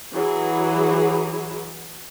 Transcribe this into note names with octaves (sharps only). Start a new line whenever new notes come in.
E3 F#3 G#4